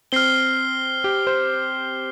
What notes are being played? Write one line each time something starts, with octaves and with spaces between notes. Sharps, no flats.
C4 F6 C7 G7
G4
C5